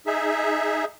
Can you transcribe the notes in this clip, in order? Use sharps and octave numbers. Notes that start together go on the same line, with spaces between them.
D#4 G#4 E5